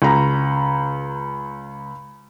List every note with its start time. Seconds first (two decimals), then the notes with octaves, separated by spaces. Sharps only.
0.02 C#2 A#5